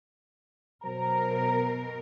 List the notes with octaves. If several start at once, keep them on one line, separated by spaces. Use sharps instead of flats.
B2 F#3 A#4 C5 A#5